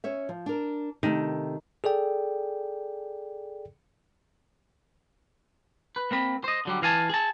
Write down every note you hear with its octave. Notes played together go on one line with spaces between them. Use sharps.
C#4 C#5 E5
F3
D4 A#4
C3 D#3 A3
G#4 A4 D5 G5
B4
A#3 C4 B5
C5 D#5
D3 F#3 G3
E3 F5 G#5 A5
G#4 A5